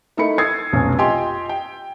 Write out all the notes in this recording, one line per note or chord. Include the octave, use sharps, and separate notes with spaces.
A3 D#4 E4 A#4 B5 C#7
D#6 E6 G#6 A6 C7
F1 B1 F2 C#4 G#5
F4 G4 D#5 G5 G#5 C6
G5